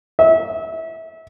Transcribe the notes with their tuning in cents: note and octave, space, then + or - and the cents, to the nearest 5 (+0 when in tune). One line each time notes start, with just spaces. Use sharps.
E5 -25